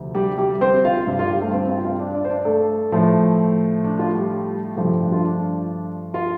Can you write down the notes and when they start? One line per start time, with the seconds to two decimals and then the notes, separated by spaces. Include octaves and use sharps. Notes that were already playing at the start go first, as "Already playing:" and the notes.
Already playing: D2 C3 F3
0.15 G3 G4
0.38 G3 G4
0.61 C4 C5
0.85 F4 F5
1.07 G2 G3
1.19 F4 F5
1.30 G3 G4
1.41 A3 A4
1.53 C4 C5
1.69 F4 F5
1.78 G5
1.84 F4 F5
2.00 D4 D5
2.14 D4 D5
2.25 C5
2.30 D4 D5
2.45 A3 A4
2.92 A2 F3 A3
3.84 D4
3.99 F4
4.15 G3 G4
4.76 G2 F3 G3 A3 G4
5.00 D4
5.12 F4
5.25 D4
6.14 F4